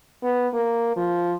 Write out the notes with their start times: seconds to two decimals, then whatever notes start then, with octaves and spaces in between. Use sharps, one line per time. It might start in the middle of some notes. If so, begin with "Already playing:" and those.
0.23 B3
0.53 A#3
0.96 F3